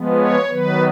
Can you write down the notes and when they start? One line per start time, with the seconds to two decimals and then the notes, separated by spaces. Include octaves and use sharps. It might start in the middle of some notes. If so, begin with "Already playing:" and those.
Already playing: F3 G#3 B3
0.16 C#5
0.49 D#3 F#3 B3 B4